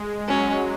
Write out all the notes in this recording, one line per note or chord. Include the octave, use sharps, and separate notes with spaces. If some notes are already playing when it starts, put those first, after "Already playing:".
Already playing: G#3
F#3 C#4